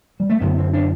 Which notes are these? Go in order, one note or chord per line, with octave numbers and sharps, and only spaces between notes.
G3
A3
F#2 D3 B3
C4
D4